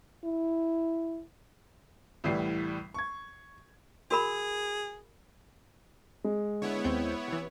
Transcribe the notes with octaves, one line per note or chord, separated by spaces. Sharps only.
E4
C2 A2 E3 G3 C7
C#6 G#6
F#4 G#4 A#4 B5
G#3
D3 B3 E4 C#5
D#2 C4 G6
C3 E3